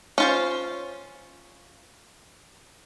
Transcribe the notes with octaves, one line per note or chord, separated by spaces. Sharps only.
C#4 F4 C5